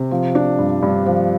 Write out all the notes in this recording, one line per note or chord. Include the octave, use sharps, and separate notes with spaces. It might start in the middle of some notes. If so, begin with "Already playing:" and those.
Already playing: C3
F3
D4
G2
G2
F3